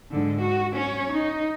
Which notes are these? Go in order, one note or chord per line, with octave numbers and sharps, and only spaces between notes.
G#2 D3
F#4
C#4 C#5
D#4